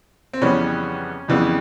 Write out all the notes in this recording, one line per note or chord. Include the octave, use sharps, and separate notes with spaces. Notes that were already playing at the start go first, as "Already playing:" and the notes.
C4
F2 C#3 E3 G3 B3 C#4
F2 C#3 E3 G3 B3